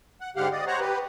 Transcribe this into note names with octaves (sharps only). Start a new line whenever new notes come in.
F#5
G#2 D3 G4 F5 F#5
D5 D#5
C5 C#5 F#5 A#5
G4 B4